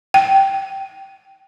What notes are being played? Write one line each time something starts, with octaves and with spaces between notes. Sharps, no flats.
G5